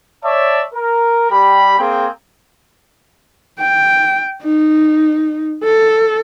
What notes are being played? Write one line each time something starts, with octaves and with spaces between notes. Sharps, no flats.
C#5 D5 E5 A5
A#4
G3 G4 B5
A#3 C4 G#4 G5
G5
D#4
A4